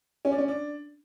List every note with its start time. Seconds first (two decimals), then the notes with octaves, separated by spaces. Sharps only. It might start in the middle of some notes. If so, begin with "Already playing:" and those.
0.25 C#4
0.32 D4
0.38 C#4
0.48 D4